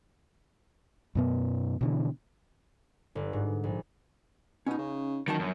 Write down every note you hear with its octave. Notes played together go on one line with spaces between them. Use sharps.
F#2 B2 B3
B2 D3 E3
G1
G#2
A#1
B2 C#4 D#4
C#3
A1 D#3 E3 F#3 A5
G1 F#2